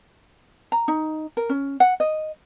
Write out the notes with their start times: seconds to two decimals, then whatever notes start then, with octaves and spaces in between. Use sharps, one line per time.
0.72 A#5
0.88 D#4
1.37 A#4
1.50 C#4
1.80 F#5
2.00 D#5